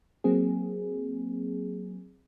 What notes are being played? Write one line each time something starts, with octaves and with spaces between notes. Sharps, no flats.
F#3 A#3 C4 G#4